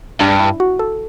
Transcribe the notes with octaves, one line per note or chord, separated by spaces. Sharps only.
G2 D4
E4
F#4
A4